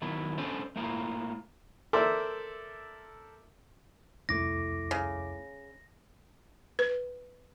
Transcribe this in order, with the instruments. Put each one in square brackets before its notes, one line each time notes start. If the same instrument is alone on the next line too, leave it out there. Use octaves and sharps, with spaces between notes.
[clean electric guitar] D#3 F#3 B3 E4
C#4 D4 A4 B4 C5 D5
A3 A#3 E4 F4
[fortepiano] A4 A#4 C5 D5 E5
[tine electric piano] C2 F2 D6 [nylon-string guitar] A3 E4 [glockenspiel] A#6
[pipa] C#3
[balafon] B4